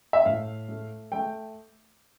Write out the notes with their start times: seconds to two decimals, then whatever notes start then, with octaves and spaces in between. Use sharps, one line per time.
0.13 E5
0.25 A2 F5
0.68 A3
1.12 A3 G5